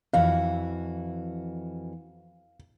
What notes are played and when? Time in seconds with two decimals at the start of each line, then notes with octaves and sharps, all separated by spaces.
0.13 F2 E3 F#4 F5